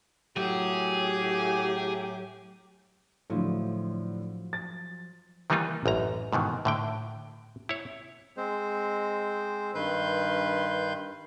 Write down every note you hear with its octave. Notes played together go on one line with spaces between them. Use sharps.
A2 F#3 G4 G#4
A2 D3 F3 F#3
A6
D#3 E3 G3 A#3 D#4 F4
A1 F#2 A#5
G#2 B2 D#3 E3
A2 D3 G5
E4 C#5
G#3 C4 C5
G2 D#3 B4 C6 G6